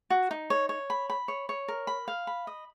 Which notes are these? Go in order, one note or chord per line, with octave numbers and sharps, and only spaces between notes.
F#4
D#4
C#5
C#5
B5
B5
C#5
C#5
A#4
B5
F5
B5
D#5